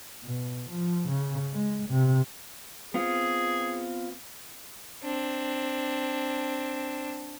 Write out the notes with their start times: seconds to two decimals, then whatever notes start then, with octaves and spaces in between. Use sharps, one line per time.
0.24 B2
0.70 F3
1.08 C#3
1.53 G#3
1.89 C3
2.94 B3 C4 F4 G#4
5.03 C4 D4